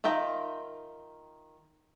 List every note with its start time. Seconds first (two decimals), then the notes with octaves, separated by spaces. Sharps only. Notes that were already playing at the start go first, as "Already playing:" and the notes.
0.04 D#3 F4 E5 G5 A#5